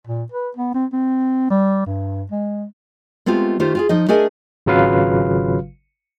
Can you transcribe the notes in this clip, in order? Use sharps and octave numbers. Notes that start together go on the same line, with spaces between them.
A#2
B4
B3
C4
C4
G3
G2
G#3
G#3 A3 B3 C4 F4 G4
D#3 A3 F4 G4 C5
F4 F#4 G#4
F3 D#4 D#5
A3 D4 G#4 A#4 D#5 G#5
G#1 C#3 F#3 F4 B4 F5